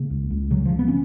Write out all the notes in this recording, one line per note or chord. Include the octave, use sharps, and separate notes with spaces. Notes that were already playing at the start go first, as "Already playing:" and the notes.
Already playing: C#3 A#3
C#2
C#2
C#3 F#3
F3
C#3
B3
C#4